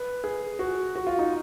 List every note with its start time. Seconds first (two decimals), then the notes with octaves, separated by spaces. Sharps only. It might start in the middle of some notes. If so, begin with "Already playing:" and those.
Already playing: B4
0.24 G#4
0.59 F#4
0.95 F#4
1.07 F4
1.19 D#4